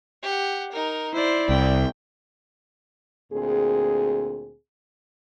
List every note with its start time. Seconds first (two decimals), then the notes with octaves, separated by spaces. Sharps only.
0.22 G4 F#5
0.71 D#4 A#4
1.13 E4 C5 D5
1.49 C2 G5
3.32 D2 A#2 C4 G#4